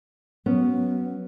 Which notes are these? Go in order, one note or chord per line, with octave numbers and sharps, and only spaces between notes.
F#3 B3 C#4